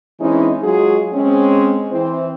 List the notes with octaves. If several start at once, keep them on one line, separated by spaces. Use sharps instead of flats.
E3 G#3 C4 C#4 D#4 E4
F#3 G#3 F4 F#4 G#4
G#3 C4 C#4
E3 C4 E4 C5